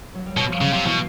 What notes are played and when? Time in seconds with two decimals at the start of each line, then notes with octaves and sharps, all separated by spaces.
0.15 F#3
0.26 G3
0.37 B2 F#3
0.49 F3
0.61 C#3
0.73 C3
0.84 B2 E3